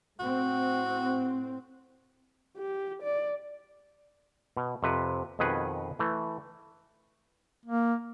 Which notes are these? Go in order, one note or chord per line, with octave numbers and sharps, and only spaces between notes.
A2 C4 F#4
G4
D5
B2
F2 C3 B4
F2 B2 D#3 G#4 B4 F#5
E3 A3
A#3